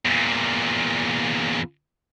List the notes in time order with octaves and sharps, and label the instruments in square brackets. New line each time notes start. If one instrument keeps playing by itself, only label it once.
[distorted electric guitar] E2 A#2